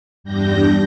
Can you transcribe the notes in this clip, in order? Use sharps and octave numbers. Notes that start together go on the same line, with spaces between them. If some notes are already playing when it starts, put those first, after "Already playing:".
E2 G2 G3 D4 G6 A#6